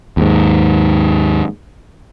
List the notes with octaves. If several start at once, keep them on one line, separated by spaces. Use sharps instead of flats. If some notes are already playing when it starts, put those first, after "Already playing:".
D#2 G#2